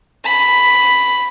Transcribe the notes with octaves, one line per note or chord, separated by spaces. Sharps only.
B5